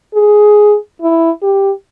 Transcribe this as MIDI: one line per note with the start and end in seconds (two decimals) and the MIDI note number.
0.14 0.76 68
1.02 1.31 64
1.42 1.71 67